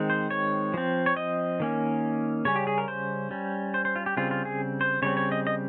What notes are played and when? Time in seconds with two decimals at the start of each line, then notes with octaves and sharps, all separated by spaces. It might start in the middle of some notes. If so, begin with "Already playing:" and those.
Already playing: D#3 G#3 C4
0.10 C5
0.31 C#5
0.74 F3 C4
1.06 C#5
1.17 D#5
1.60 D#3 A#3 C#4
2.45 C#3 G3 C#4 C#5
2.56 G4
2.67 G#4
2.78 A#4
2.88 C5
3.31 G3 C#4
3.74 C5
3.85 C5
3.96 F4
4.06 G4
4.17 C#3 G3 C4 F4
4.31 F4
4.45 G#4
4.81 C5
5.02 C#3 G3 C4 C#5
5.17 C#5
5.32 D#5
5.47 D#5